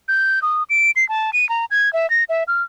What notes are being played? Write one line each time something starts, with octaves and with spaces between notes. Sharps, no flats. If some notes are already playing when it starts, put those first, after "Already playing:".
G6
D#6
D7
C7
A5
D#7
A#5
G#6
E5
A#6
E5
F6